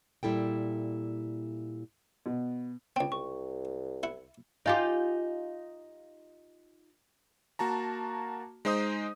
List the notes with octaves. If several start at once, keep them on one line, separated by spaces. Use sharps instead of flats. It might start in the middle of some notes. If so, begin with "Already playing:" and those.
A#2 G3 E4 A4 G5
B2
C#2 C4 G5
C2 C#6
E4 F#5
D#4 F4 G4 D#5 F5 G#5
A#3 F#4 A5 A#5
G#3 D#4 C5 D#5 D#6